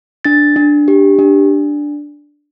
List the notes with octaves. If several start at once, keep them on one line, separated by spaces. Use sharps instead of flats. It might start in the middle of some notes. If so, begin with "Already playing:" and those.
D4 A6
D4
G4
D4